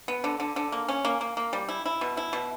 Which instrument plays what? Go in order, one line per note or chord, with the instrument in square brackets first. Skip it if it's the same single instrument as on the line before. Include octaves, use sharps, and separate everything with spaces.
[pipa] B3
D3
D3
D3
A#3
C#4
A#3
A#3
A#3
G3
E4
E4
B2
E4
B2